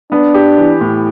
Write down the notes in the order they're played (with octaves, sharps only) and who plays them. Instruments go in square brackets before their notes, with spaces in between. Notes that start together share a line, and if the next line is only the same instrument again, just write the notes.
[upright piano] B3 [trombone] D4
[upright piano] G4
E3
A2